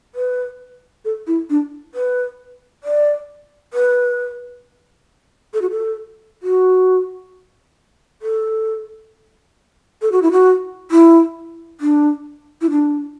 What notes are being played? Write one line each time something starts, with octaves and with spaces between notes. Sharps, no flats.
B4
A4
E4
D4
B4
D5
B4
A4
F#4
A4
F#4
A4
A4
F#4
E4
F#4
E4
D4
E4
D4